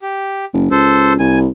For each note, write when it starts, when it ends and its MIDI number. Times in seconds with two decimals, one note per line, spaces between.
0.02 0.45 67
0.53 0.68 30
0.71 1.16 37
0.71 1.13 69
0.71 1.13 72
1.19 1.47 36
1.19 1.39 80